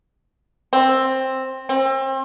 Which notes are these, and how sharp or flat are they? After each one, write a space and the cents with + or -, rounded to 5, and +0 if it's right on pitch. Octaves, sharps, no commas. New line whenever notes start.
C4 +10
C4 +35